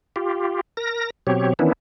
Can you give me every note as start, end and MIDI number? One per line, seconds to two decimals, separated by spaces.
0.16 0.61 65
0.16 0.61 67
0.77 1.10 70
0.77 1.10 94
1.27 1.53 47
1.27 1.53 54
1.27 1.53 60
1.27 1.53 67
1.27 1.53 73
1.59 1.73 51
1.59 1.73 52
1.59 1.73 59
1.59 1.73 61
1.59 1.73 62
1.59 1.73 64